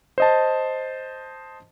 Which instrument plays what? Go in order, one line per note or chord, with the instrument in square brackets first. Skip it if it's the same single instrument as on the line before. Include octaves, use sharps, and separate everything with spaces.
[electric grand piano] C5 D#5 A5